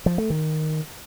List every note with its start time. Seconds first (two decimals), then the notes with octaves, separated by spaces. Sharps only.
0.06 F3
0.18 A3
0.30 D#3